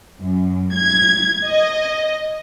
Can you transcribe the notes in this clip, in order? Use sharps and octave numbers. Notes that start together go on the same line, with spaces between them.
F#2
G#6
D#5